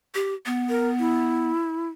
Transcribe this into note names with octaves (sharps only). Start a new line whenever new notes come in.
G4
B3
A#4
E4